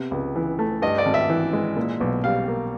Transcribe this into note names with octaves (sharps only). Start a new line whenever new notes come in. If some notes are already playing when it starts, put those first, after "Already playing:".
Already playing: C3 B3
C#2
E3
A3
G2 D#5
D5
G#1
E5
E3
G#3
A#2
B1
G3 F5
A#3